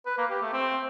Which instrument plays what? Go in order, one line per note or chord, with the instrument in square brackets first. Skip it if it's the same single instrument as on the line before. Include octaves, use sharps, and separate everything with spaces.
[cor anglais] B4
A#3
G4
A3
C4